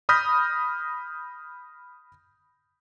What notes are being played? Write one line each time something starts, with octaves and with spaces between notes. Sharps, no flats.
B5 D#6 F6 G6 A#6 B6